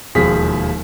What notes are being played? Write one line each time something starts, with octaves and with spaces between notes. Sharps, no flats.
E1 D#2 F3 G#4 B6